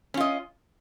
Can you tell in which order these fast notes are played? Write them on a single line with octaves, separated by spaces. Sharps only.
C#4 F4 D#5